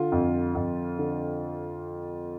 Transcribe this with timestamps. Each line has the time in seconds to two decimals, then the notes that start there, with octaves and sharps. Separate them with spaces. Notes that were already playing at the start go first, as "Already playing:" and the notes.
Already playing: D3 F4
0.12 F2
0.55 F2
0.98 D3